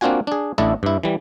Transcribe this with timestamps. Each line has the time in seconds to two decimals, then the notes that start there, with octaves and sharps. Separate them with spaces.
0.01 A#3 C4 D4 F4 F#4 G#5
0.27 D4 G#4
0.58 A1 A3 D4 E4 A4 D#5
0.83 G2 E4
1.03 E3 G3